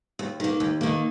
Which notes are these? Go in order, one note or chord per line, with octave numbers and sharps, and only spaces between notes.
D#2
D#3 A#3
D#2
D#3 A#3